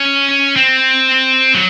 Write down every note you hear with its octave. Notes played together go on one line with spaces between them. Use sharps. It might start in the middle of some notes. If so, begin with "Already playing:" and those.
Already playing: C#4
C4
F#3